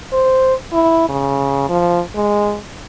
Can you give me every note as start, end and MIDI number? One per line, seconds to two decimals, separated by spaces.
0.13 0.54 72
0.73 1.05 64
1.09 1.65 49
1.69 2.01 53
2.15 2.58 56